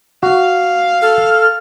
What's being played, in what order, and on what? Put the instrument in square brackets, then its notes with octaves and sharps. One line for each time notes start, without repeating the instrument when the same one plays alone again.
[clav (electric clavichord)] F#4 [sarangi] F5
[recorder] A4 [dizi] F6